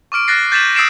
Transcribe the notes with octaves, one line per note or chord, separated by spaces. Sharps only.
C#6 D6 F6 D7
F#6 A6 A#6 C7
G6 A6 B6 D#7 E7 F#7
D#6 E6 A6 C7 D7 E7